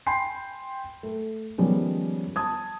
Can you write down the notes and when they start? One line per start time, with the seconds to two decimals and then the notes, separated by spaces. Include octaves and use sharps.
0.07 G5 G#5 B5 C6 C7
1.03 A3
1.58 D#3 F3 G3 G#3 B3 C#4
2.36 A5 D#6 G#6